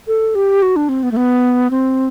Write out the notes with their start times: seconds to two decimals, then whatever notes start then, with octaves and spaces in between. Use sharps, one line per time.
0.07 A4
0.35 G4
0.62 F#4
0.76 D4
0.89 C4
1.03 B3
1.12 A3
1.17 B3
1.71 C4